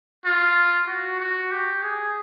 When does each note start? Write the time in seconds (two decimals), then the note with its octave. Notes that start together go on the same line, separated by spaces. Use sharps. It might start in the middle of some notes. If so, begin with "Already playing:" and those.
0.25 F4
0.88 F#4
1.20 F#4
1.51 G4
1.83 G#4